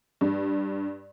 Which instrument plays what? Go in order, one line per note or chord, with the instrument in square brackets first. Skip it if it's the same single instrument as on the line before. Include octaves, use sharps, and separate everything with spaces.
[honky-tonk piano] G2